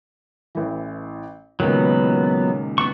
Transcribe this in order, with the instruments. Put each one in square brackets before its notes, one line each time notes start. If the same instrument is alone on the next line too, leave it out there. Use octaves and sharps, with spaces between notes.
[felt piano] A1 E3
[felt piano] C#2 A#2 D#3 [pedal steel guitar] F#3 B3
[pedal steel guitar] B3 F#4 C#6